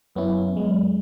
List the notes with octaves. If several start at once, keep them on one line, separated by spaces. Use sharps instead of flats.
F#2 B3 C#4 E4
F#2 G#3